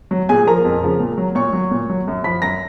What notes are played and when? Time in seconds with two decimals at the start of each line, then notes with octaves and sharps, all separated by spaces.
0.11 F#3
0.29 A#2 G#4 G#5
0.47 F3 A#4 A#5
0.65 F2
0.83 C#3 F3
1.00 A#2
1.17 F#3
1.35 A#2 C#5 C#6
1.53 F#3
1.71 A#2
1.89 F#3
2.07 F#2
2.24 F3 B5 B6
2.42 F#2 A#5 A#6